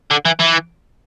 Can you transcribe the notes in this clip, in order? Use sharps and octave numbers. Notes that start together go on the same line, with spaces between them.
D3
E3
E3